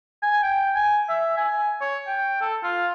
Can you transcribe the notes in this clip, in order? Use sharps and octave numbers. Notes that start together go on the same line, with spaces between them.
G#5
G5
G#5
E5
G#5
C#5
G5
A4
F4